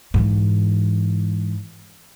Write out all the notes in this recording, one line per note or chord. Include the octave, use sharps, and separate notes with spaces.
G#2 E3